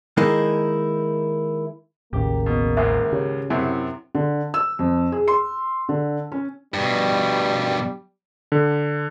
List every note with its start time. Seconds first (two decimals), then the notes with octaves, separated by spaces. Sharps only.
0.17 D#3 G#3 A#3 D#4 E4
2.13 A1 D#2 C#3 A#3 G4
2.46 B2
2.77 C#2 G#2 D#3 E5
3.12 C#3 G4 C#5
3.50 F#2 C3 E4
4.15 D3
4.54 E6
4.79 F2
5.12 G#4
5.28 C6
5.89 D3
6.32 C#4
6.74 G2 B2 G3
8.52 D3